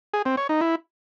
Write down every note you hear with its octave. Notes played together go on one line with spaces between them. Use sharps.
G#4
C4
C#5
D#4
E4